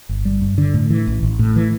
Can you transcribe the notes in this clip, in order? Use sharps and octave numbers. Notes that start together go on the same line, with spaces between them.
G1
G3
G2
D3
A2
E3
A1
A1
A2
E3